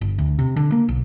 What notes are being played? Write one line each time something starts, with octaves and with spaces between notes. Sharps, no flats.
G1
D2
C3
D3
A#3
B1